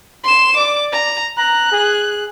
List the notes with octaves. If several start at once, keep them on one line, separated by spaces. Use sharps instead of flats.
C6 E7
D5 D6
A#5
A#5 F#6
G#4